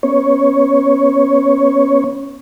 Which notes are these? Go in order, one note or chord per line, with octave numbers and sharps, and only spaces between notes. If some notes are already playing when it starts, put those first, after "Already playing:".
B3 C#4 C#5